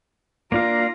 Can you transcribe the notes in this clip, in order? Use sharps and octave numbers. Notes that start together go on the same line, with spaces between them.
A#3 D4 F4 F5 A#5